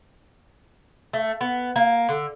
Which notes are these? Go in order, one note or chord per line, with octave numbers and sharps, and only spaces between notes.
A3
B3
A#3
D3